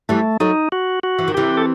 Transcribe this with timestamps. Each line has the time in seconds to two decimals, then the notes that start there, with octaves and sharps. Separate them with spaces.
0.09 E3 G3 A3
0.40 F#3 A3 D#4
0.72 F#4
1.03 F#4
1.18 E3
1.28 D#3
1.34 C3 E3 G4
1.57 A4